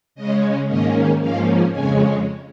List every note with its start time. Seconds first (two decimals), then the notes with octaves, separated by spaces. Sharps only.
0.15 C#3 G#3 C#4 D#5
0.68 G#2 D#3 A#3 C#4 D#5
1.20 G#2 F3 A#3 C#4 F5
1.71 F2 C#3 G#3 C#4 G#5